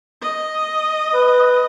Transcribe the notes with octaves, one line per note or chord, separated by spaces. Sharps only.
D#5
B4